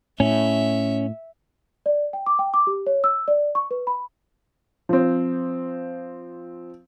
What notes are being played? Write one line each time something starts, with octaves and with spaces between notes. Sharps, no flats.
A2 C#4 E5
D5
G5
D6
G5
D6
G4
C#5
E6
D5
C#6
B4
B5
F3 C4